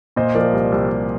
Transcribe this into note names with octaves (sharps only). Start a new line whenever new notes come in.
A#2 C5 D#5
F3 A#4 D5
C2
C2
C2